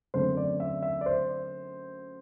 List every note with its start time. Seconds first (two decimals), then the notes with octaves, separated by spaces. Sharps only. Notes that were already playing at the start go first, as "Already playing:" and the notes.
0.14 F#2 D3 A3 C4 C5
0.37 D5
0.60 E5
0.83 E5
1.01 D5
1.06 C5